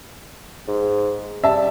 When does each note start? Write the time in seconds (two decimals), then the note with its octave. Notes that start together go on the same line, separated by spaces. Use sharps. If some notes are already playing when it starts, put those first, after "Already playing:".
0.68 G#2
1.44 G3 E5 A5